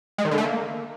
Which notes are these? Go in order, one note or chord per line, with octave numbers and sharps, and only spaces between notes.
G#3
D#3
D3
A3
A#3